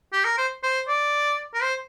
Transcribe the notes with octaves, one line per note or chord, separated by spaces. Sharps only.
G4
A#4
C5
C5
D5
A#4
C5